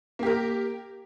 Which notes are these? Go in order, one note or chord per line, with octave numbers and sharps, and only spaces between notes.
A#3 G4 A#4